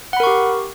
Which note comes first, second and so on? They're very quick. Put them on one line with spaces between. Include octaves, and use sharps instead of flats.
F#5 B5 A#4 C#6 G4